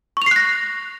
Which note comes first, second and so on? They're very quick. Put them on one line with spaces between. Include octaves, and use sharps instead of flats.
C#6 F7 C7 F#6 A#6